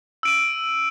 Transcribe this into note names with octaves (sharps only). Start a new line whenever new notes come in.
E6 D7 D#7